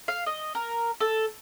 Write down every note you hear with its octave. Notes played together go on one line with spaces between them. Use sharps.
F5
D#5
A#4
A4